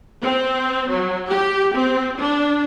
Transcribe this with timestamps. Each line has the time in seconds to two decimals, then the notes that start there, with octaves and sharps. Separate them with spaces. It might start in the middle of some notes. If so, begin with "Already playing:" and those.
0.22 C4
0.90 F#3
1.30 G4
1.76 C4
2.20 D4